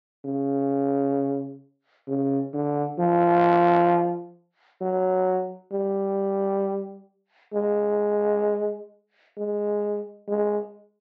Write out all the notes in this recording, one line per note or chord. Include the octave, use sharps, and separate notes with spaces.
C#3
C#3
D3
F3
F#3
G3
G#3
G#3
G#3